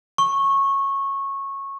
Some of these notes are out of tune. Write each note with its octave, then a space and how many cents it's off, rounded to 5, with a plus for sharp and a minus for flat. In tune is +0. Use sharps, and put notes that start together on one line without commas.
C#6 -15